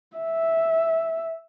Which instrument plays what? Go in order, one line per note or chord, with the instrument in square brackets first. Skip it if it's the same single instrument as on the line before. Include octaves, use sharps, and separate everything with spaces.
[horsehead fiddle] E5